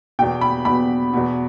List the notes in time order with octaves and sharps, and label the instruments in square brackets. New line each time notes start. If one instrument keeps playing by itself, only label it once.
[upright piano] E2 B2 G5
B5
E2 B2 B5
E2 B2